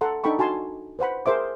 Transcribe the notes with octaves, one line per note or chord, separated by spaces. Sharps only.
A4 F#5 A#5 C6
D4 D#4 A4 G5 B5 C#6
F#4 G#5 A5 C6
B4 C5 F#5 B5
G#4 A#4 C5 E5 D6